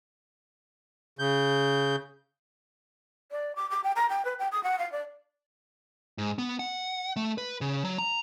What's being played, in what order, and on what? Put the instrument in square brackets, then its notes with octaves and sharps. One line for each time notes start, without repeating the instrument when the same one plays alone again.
[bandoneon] C#3 G6
[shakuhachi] D5
D6
D6
G5
A#5
G5
B4
G5
D#6
F#5
F5
D5
[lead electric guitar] G#2
B3
F#5
A3
B4
C#3
F#3
A#5